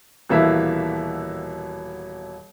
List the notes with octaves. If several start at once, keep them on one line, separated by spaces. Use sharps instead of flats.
D#1 B2 E3 A#3 E5